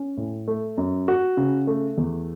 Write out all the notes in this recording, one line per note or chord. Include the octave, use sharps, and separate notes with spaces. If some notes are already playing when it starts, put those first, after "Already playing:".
Already playing: C#4
A2
A3
F#2
F#4
C#3
A3
E2